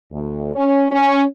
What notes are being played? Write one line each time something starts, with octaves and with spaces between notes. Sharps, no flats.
D2
C#4
C#4